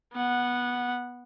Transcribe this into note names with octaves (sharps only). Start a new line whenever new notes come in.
B3 F#5